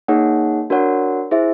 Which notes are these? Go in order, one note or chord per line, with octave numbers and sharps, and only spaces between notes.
A#3 D#4 G#4 C#5 F#5
D4 F#4 A#4 C#5 F#5
E4 G#4 C5 E5